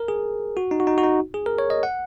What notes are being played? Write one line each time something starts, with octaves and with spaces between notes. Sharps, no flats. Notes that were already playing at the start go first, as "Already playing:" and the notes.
Already playing: A#4
G#4
F#4
D#4
F#4
D#4
F#4
D#4
G#4
A#4
C#5
D#5
F#5